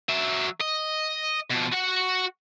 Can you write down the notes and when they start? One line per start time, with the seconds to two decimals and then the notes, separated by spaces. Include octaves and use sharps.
0.09 F#3 E5
0.61 D#5
1.50 B2 F3
1.72 F#4 F#5